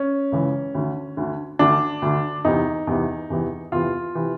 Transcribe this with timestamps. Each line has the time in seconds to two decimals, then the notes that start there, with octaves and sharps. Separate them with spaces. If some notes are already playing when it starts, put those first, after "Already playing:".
Already playing: C#4
0.32 C#2 C#3 E3
0.75 D2 D3
1.17 D2 D3
1.59 D2 D3 D4
2.02 D2 D3
2.45 E2 C3 E3 D#4
2.87 E2 C3 E3
3.30 E2 C3 E3
3.72 E2 C3 E3 F4
4.15 C3 E3